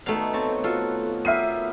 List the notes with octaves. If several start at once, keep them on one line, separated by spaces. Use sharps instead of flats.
B2 D#3 A3 F5
C4 C#5 A5
F4 F#4 A4
B3 G4 A#4 E5 C7 D#7